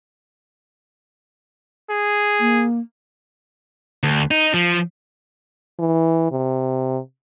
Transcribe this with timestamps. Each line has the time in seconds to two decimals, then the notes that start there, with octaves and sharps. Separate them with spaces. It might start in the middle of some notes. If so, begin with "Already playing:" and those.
1.90 G#4
2.40 A#3
4.03 D2
4.31 D#4
4.54 F3
5.79 E3
6.31 C3